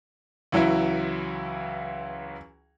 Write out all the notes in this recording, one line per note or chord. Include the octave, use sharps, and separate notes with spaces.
C#2 E3 F#3 E4